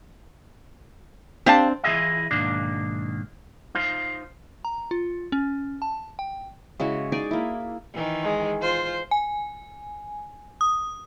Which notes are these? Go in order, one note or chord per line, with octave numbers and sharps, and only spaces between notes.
C4 D4 G4 F5 A5
E3 E4 F4 G#4 D#5 E5
B1 G#2 D#3 A#3 D4
D#4 F4 C5
A#5
F4
C#4
A5
G5
C#3 G#3 E4 F#4
D#4 G#4 D5 G#5
A#3 E4
D#3 E3
G#3
F4 C5
G#5
D#6